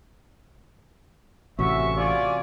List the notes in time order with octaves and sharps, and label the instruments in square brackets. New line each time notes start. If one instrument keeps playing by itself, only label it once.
[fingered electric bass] A1 [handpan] C3 C#4 F#4 [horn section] E5 [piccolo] C#6
[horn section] F4 D5 G#5